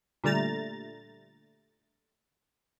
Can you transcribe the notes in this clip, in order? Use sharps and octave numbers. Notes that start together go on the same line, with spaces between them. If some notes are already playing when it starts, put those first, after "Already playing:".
A#2 D3 G3 A3 A#5 A6